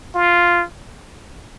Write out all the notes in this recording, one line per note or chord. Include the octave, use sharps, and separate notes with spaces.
F4